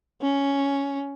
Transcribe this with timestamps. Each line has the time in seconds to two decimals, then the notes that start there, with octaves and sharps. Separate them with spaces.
0.22 C#4